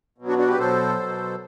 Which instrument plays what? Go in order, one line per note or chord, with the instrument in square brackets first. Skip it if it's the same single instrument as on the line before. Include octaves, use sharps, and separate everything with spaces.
[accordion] B2 F#3
D4 F#4
D4 F#4
G4 B4
B2 F#3 A4 C5
B2 F#3